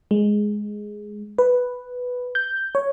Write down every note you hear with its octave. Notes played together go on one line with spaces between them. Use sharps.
G#3
B4
G6
C#5